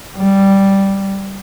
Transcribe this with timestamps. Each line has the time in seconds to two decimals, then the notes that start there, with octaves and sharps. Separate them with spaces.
0.16 G3